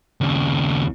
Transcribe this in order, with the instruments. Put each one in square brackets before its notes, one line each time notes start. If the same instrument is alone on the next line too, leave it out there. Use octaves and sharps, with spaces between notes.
[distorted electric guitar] D#2 C#3